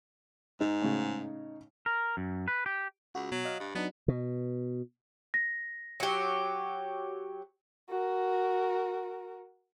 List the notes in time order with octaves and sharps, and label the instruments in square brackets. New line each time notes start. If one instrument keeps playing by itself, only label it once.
[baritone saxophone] G#2 [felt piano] D#4
[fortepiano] A2 C#3
[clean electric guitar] A#4
F#2
B4
G4
[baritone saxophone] C#2 [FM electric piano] F#4
[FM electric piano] B2 [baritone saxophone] F#3
[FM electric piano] D#5 F5 F#6
[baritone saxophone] G2
[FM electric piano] F#3 D4 D#4 [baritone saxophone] B3
[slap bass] B2
[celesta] A#6
[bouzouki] F#3 G4
[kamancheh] F#4 A#4